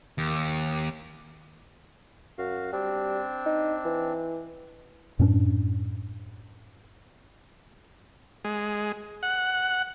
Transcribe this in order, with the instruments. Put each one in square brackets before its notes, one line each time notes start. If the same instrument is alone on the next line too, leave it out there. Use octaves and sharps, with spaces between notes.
[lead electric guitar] D#2
[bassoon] F#2 [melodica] F#4 F5
[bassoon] G3 [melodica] C4 D4
[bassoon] D#4
E3
[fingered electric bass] F#2 A2 C#4 D4
[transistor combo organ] G#3
F#5